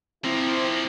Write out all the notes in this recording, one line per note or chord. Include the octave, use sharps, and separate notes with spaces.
F3 A#3 C4 E4